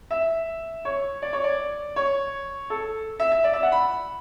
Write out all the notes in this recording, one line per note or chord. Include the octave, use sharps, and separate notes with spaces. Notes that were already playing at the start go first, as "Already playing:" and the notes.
E5
C#5
D5
C#5
D5
C#5
A4
E5
E5
D5
E5
F#5
B5